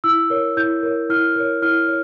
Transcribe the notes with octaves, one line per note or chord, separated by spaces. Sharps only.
E4 E6
A#4 C#5
E4 G6
A#4 C#5
E4 F6
A#4 C#5
E4 F6
C#5